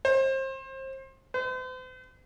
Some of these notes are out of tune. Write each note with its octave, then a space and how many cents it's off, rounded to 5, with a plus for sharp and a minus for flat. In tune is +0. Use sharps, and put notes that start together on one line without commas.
C5 +30
C5 -45